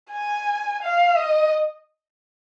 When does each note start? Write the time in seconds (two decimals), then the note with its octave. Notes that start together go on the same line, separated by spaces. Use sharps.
0.12 G#5
0.83 F5
1.17 D#5